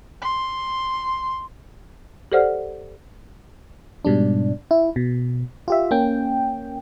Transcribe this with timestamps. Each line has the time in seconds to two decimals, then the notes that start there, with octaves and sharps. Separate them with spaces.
0.22 C6
2.32 G4 A4 C5 D5 F#5 F6
4.05 G#2 B2 G3 D4
4.71 E4
4.96 B2
5.68 F4 G4 E5
5.91 A#3 C#4 G5